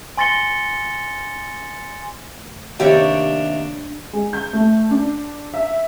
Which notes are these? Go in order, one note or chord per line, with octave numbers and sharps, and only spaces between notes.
G#5 C6 A6 A#6 C#7 G7
F1
D#2 C3 D4 G4 C#5 D5
G#3
G6
A3
D4
E5